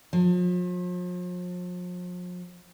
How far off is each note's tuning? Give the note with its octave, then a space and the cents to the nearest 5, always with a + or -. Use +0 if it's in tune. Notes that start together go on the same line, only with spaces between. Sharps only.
F3 +40